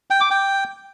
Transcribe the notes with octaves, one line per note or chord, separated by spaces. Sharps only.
G5
D6
G5